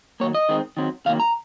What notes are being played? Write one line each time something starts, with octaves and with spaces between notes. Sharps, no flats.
D#3 F#3 A#3 C#5
D#5
D#3 G#3 C4
D#3 F#3 C4
C3 D#3 F#3 A#3 F5
A#5